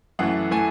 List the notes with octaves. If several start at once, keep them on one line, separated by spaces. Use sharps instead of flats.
F#2 E3 A3 F#5
E3 A3 G#5